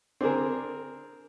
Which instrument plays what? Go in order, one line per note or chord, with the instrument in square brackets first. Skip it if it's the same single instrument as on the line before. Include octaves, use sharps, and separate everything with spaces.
[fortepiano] C4 D4 G#4 A#4